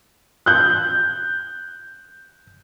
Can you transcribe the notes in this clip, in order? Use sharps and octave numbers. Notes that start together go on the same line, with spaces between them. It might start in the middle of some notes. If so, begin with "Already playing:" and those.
F#6 G6